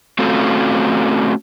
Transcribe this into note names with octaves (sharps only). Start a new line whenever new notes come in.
A3 C4 C#4 F4 F#4 A4